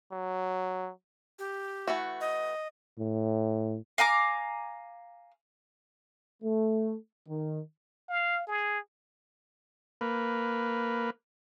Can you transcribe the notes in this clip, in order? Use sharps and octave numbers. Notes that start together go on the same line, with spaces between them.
F#3
G4
E3 A3 F#4
D#5
A2
F5 G#5 A#5 D6
A3
D#3
F5
G#4
A#3 B4